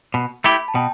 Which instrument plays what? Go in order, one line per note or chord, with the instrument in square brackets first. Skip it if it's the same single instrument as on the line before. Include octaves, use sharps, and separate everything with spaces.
[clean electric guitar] B2
[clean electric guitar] A3 E4 G4 [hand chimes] B5
[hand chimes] A5
[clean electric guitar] B2 [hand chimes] G5